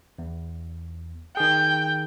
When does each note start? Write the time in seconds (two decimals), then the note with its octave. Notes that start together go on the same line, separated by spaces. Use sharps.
0.19 E2
1.37 D#3 G#4 G5